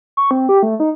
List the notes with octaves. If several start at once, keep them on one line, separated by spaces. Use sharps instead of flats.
C#6
C4
G4
A3
D#4